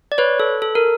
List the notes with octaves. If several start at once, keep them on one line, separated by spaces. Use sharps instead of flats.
D5
B4 C#5
A4
A4
A#4